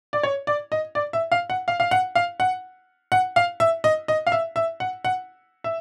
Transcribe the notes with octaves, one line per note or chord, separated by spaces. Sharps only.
D5
C#5
D5
D#5
D5
E5
F5
F#5
F5
F5
F#5
F5
F#5
F#5
F5
E5
D#5
D#5
F5
E5
E5
F#5
F#5
E5